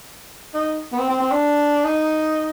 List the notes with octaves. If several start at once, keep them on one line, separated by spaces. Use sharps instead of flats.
D#4
B3
C4
C4
C4
D4
D#4